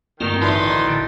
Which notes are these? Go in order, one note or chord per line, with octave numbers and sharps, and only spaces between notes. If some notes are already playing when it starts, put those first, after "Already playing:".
D2 G2 D#3 A#3 C4 F4
A1 D#4 B4 D5 E5 A5 C6
A2 D3